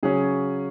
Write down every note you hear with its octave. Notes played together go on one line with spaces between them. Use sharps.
C#3 F#3 C#4 G#4